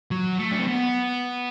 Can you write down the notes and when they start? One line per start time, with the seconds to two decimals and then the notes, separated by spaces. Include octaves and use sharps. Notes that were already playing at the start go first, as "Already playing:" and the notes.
0.11 F#3
0.39 A3
0.52 D4
0.60 C4
0.67 B3